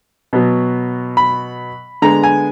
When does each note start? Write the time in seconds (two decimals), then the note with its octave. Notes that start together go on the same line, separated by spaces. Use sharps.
0.33 B2 F#3 B3
1.17 B5
2.02 D3 G#3 B3 A#5
2.24 G#5